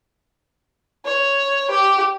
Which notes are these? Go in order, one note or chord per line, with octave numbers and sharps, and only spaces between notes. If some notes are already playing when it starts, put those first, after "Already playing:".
C#5
G4